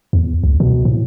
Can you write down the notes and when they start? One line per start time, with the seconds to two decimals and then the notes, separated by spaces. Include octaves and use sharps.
0.13 E2
0.44 C#2
0.60 B2
0.85 A2